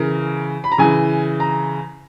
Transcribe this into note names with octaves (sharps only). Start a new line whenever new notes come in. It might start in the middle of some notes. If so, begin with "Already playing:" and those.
Already playing: C#3 E3 A#4
B5
A#5
C#3 E3 G#5
A#5